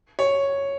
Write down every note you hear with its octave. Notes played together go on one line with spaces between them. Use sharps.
C#5